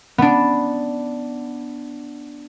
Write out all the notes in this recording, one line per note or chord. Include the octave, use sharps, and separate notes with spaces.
B3 D4